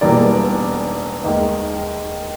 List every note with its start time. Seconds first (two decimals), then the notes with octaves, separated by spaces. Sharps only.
0.01 E1 E2 B2 G3 A#3 D5
1.24 D#2 D#3 G#3 D#5